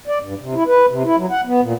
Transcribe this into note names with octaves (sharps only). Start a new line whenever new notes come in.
D5
G2
C3
E4
B4
C3
E4
F#3
F#5
B3
A#2